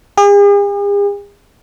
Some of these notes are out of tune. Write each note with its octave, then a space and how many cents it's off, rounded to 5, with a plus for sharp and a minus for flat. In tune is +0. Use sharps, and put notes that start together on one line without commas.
G#4 -45